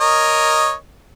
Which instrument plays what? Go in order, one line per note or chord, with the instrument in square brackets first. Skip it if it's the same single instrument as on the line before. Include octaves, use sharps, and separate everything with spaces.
[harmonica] A#4 C#5 D#5